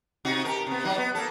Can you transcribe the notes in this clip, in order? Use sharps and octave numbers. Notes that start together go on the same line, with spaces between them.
C3 D#4 F#4
G4 A4 A#4
C3 B3
F#3 D#4
B3
A#3 A4